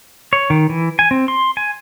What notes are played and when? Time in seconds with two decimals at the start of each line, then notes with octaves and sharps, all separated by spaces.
0.33 C#5
0.50 D#3
0.69 E3
0.99 G#5
1.11 C4
1.28 C6
1.57 G#5